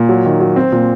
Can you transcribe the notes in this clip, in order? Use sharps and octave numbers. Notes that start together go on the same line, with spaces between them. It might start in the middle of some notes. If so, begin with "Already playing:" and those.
Already playing: A#2
F#3
D#3
F#3
C4
A#2